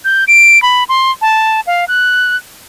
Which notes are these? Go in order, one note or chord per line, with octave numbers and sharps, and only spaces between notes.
G6
D7
B5
C6
A5
F5
F#6